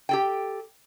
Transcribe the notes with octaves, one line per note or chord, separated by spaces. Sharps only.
G4 A4 G5